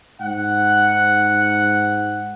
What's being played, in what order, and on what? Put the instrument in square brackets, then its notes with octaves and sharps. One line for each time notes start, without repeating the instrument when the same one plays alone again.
[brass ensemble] G#2 F#5